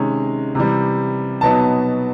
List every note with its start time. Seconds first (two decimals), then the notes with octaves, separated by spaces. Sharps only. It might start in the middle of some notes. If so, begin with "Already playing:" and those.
Already playing: C3 D#3 G#3 C#4
0.55 C3 E3 G3
1.41 B2 F#3 B3 D#4 A5